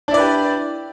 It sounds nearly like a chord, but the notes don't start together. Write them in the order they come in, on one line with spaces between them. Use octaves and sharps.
D4 E4 D5 B4 G4